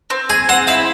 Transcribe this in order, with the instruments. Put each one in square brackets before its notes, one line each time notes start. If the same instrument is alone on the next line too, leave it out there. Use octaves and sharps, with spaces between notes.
[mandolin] C4
[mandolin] G#4 [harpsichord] G#5
[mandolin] C4 [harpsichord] F#5
[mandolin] E4 [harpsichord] F5